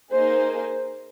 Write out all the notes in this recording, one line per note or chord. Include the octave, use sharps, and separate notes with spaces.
A#3 D#4 G#4 C5